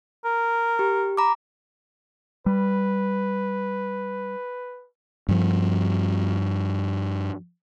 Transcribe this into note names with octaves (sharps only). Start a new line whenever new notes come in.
A#4
G4
A#5 B5 D6
G3 B4
G2 F3